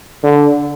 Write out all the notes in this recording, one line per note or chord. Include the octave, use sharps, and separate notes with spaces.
D3